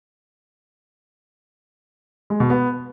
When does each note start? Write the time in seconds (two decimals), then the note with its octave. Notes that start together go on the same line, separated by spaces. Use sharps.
2.30 G#3
2.40 B2
2.50 B3